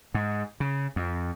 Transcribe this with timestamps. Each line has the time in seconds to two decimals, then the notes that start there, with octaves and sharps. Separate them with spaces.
0.14 G#2
0.60 C#3
0.96 F2